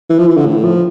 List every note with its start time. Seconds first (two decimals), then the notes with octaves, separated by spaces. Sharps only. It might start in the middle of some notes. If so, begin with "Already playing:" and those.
0.10 E3
0.19 F3
0.27 E3
0.37 D3
0.46 A2
0.64 F3